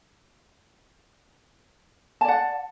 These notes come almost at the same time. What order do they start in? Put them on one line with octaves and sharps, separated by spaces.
A5 D5 F#5